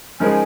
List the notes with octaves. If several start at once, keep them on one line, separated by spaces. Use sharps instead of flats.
C#3 F3 G#3 D#4 A#4 G#5